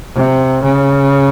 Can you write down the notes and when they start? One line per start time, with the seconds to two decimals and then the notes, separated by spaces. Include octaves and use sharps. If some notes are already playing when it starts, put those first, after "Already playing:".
0.15 C3
0.63 C#3